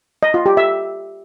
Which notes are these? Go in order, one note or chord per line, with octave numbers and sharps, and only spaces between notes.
D#5
F4
G4
E5